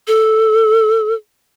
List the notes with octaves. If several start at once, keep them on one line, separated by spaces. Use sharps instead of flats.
A4